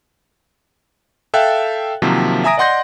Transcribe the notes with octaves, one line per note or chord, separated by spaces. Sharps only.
A4 E5 F5 G5 F#6 A6
C3 D#3 F3 F#3 A#3
E5 G#5 A#5 D#6 A#6 D7
D5 D#5 F#5 C6 G6 A#6